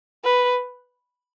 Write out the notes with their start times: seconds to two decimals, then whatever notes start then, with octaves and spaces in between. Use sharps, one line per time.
0.24 B4